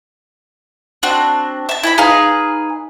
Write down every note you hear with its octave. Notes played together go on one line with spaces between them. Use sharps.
C4 D4 F#4
E5 A5
E4 G5 B5
D#4 G#4 B4 F5